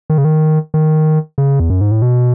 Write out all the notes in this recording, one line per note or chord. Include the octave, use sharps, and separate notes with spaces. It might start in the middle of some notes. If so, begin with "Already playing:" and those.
D#3
C#3
D#3
D#3
C#3
E2
F#2
G#2
A2
B2